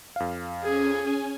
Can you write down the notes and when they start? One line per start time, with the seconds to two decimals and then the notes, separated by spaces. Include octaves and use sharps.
0.16 F2 F5
0.63 C#4 G#4 G#5